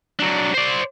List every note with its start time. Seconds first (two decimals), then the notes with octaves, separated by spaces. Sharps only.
0.19 F#3 D4
0.54 C5 D5